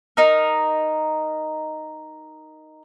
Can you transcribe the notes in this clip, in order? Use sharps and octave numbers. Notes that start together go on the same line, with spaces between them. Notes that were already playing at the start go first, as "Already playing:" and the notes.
D#4 A#4